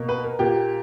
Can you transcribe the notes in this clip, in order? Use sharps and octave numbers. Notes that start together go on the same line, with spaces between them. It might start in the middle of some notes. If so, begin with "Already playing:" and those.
Already playing: B2 A#3
B4
A#4
A#2 A#3 G4